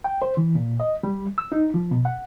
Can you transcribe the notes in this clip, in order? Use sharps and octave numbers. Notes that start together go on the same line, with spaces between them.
G5
C5
E3
A#2
D#5
G3
E6
D#4
F3
B2
F#5